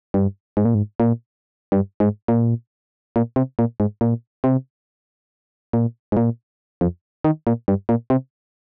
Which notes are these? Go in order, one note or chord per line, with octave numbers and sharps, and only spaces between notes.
G2
G#2
A#2
G#2
A#2
G2
G#2
A#2
A#2
C3
A#2
G#2
A#2
C3
A#2
G#2
A#2
F2
D#3
A#2
G2
A#2
C3